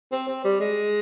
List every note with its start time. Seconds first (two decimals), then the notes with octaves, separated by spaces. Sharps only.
0.12 C4
0.28 C4
0.44 G3
0.60 G#3